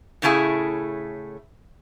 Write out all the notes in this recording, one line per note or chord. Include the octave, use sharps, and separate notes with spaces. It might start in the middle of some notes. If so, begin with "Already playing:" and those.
A2 C#3 A3 E4 G#4